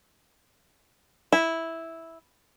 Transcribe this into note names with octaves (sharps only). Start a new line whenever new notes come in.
E4